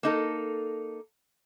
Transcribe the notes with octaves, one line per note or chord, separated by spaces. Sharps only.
A#3 D#4 A4